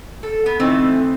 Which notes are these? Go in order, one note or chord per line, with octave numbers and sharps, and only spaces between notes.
A4
B3
E3 A3 C4 D#4